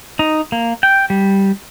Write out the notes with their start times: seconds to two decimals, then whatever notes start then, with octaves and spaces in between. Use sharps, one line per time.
0.19 D#4
0.52 A#3
0.83 G5
1.10 G3